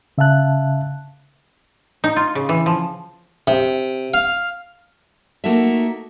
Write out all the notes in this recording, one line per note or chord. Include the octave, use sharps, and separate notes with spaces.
C#3 E5 F5 A5 F#6
D#4
F4
C#3
E3
F3
C3
F5
A3 A#3 D#4 F#4 A4 E5